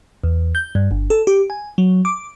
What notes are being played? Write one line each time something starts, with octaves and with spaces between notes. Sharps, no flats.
E2
G6
G2
G1
A4
G4
G#5
F#3
D6